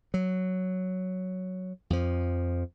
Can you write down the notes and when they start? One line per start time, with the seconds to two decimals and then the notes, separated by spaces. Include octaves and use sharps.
0.14 F#3
1.90 F2 F3